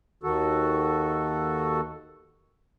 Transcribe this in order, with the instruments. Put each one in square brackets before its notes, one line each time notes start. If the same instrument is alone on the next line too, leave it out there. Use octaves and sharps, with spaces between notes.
[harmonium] D#2 D#3 F#4 A4